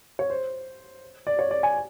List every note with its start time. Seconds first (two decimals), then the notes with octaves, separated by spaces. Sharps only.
0.19 C#5
0.30 C5
1.27 D5
1.39 C#5
1.51 D5
1.63 G#5